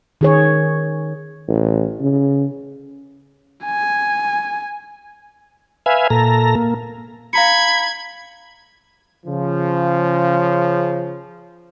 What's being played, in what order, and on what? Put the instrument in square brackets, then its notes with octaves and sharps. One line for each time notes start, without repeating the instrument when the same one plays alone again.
[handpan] D#3 G#4 C#5
[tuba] A1
C#3
[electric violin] G#5
[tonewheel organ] B4 E5 F5 G#5
A#2 A4 A#5
A#3
[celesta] F5 A#5 C#7 [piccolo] B5 [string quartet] G#6
[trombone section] C#3 F3